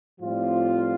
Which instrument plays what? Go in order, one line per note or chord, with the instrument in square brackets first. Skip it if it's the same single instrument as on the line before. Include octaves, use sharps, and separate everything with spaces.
[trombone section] A2 F3 G3 C4 F4